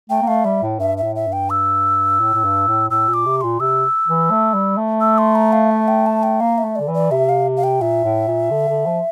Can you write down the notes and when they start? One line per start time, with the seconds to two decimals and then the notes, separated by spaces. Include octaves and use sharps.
0.10 A3 G5
0.22 A#3
0.27 A3 F5
0.44 G3 E5
0.62 A2
0.80 G2 E5
0.98 E5
1.03 A2
1.16 E5
1.27 G2
1.33 G5
1.50 E6
2.20 A2
2.34 A2
2.44 G2
2.67 A2
2.90 A2 E6
3.08 A#2
3.14 D6
3.26 C3
3.37 D6
3.41 A#2 C6
3.60 C3 E6
4.08 E3
4.31 A3
4.54 G3
4.77 A3
5.01 E6
5.18 C6
5.35 A#5
5.53 F5
5.71 E5
5.88 G5
6.06 A5
6.23 G5
6.40 A#3 F5
6.58 E5
6.64 A3
6.76 D3 D5
6.88 E3
6.94 D5
7.11 C3 E5
7.29 F5
7.57 F5
7.64 G5
7.81 A#2 E5
8.04 A2
8.27 A#2
8.51 D3
8.69 D3
8.86 F3